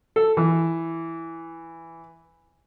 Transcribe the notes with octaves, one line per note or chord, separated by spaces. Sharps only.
A4
E3